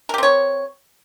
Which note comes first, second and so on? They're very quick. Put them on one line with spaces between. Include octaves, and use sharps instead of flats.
A#4 G4 C4 C#5